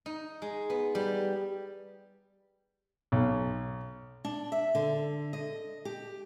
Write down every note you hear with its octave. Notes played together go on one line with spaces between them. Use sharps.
D#4
G#3
B3
G3
B1
D4
E5
D3
D#5
G4